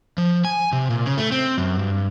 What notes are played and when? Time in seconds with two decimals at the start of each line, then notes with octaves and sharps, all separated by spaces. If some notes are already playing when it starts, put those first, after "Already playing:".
0.18 F3
0.45 G#5
0.73 C3
0.90 A#2
1.06 C#3
1.18 A3
1.32 C4
1.58 F#2
1.79 G2